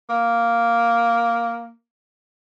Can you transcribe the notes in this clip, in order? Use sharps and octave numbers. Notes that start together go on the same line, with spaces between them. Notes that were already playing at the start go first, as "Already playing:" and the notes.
A#3